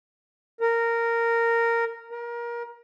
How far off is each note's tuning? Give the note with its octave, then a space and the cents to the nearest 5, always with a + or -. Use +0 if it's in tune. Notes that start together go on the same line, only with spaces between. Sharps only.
A#4 -10
A#4 +25